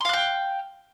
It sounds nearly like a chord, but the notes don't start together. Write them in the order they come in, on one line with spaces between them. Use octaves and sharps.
C6 F5 F#6 G5